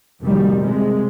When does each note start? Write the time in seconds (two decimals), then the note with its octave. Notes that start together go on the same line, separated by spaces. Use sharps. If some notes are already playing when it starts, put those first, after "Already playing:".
0.22 F1 F#2 A#2 D#3 G3
0.58 C3 G#3